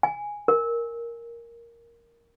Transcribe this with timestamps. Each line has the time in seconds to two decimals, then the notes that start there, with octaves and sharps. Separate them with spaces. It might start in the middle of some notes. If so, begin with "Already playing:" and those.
0.03 G#5
0.48 A#4